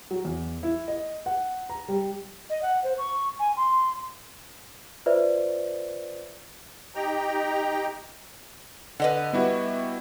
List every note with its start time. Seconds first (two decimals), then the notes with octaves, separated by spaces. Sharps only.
0.11 F#3
0.25 E2
0.63 E4
0.88 D#5
1.26 F#5
1.70 A#5
1.88 G3
2.50 D#5
2.62 F#5
2.84 C5
2.98 C#6
3.39 G#5
3.57 C6
5.06 F4 B4 C5 D5 E5
6.95 D#4 G4 G5 A#5
9.00 D3 B4 D#5 F#5
9.33 G3 B3 E4 F#4